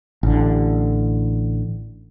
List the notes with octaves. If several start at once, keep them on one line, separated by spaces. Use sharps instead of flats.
A1 D3